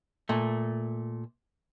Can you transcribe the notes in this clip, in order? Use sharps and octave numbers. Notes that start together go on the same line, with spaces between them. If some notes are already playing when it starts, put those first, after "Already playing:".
A#2 A3